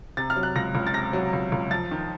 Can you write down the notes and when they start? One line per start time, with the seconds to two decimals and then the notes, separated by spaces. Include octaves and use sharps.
0.17 C3 A6
0.30 F6
0.36 F#3
0.43 F#6
0.56 C#2 A#6
0.75 C#2
0.87 A6
0.94 C3 A#6
1.13 F#3
1.33 C#2
1.52 C#2
1.71 F2 A6
1.91 D#3